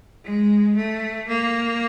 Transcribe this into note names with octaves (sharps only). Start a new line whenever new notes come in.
G#3
A3
A#3